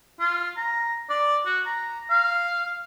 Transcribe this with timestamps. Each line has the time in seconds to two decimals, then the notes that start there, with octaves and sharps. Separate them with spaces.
0.20 F4
0.57 A#5
1.10 D5
1.46 F#4
1.66 A#5
2.10 F5